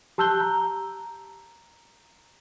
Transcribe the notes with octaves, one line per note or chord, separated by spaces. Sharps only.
G4 A5 E6 F#6 G6 G7
A#5